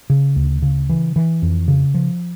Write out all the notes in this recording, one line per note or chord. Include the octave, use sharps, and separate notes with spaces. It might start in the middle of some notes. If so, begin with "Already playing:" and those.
C#3
D2
C#3
E3
E3
F2
C#3
F3